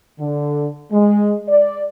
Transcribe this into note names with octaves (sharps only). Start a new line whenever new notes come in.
D3
G#3
D5